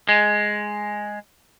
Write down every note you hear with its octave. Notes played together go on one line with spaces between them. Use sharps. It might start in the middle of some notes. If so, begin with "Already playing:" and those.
G#3